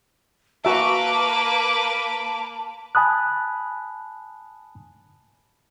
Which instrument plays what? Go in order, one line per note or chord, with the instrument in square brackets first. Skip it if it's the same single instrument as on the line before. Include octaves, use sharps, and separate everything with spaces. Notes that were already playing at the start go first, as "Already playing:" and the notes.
[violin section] A#3 B4 D6 [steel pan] F#4 E5 [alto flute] A5
[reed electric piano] G#5 A5 B5 D#6 F#6